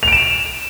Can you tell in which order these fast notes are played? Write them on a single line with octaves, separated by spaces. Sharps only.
F7 D7 E7